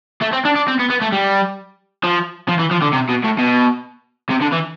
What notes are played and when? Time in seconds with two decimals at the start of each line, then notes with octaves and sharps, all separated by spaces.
0.22 A3
0.33 C4
0.45 D4
0.56 D4
0.68 C4
0.79 B3
0.90 B3
1.01 A3
1.12 G3
2.04 F3
2.49 F3
2.59 E3
2.71 F3
2.82 D3
2.93 C3
3.09 B2
3.24 A2
3.39 B2
4.29 C3
4.41 D3
4.52 E3